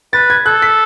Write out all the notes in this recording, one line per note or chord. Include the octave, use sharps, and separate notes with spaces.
B4 A6
G#6
A4 F#6
B6